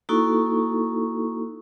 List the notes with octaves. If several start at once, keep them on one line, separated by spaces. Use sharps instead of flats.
A#3 D#4 E4 F#4 A4 C#6